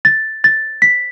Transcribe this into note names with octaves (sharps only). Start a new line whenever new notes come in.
A6
A6
B6